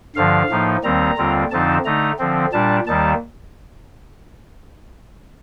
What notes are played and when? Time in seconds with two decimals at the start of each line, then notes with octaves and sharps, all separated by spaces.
0.16 G2 D3 F3 F5
0.49 A2 F3 A#3 D#4
0.83 D#2 D#3 G3 C4 A#5
1.17 D#2 D3 G3 C4 F4
1.51 F2 D3 F3 C4 D#4 A5
1.85 D3 A3 D#4 A#5
2.18 D3 F3 C4
2.53 A#2 G3 D4 A5
2.87 D#2 D#3 G3 A#3 A5